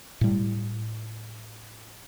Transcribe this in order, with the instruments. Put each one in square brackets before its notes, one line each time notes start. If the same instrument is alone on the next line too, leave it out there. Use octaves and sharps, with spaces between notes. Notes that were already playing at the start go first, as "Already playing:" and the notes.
[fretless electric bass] A2 G3